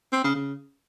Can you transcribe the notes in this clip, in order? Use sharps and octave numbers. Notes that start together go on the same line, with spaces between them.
C4
C#3
C#3